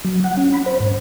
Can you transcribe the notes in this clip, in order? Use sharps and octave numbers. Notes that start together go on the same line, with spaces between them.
F#3
F#5
C#4
B5
C5
G#2